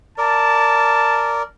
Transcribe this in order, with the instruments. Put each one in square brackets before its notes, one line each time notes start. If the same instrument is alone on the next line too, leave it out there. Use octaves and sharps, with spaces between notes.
[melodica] A#4 D5 [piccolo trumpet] A5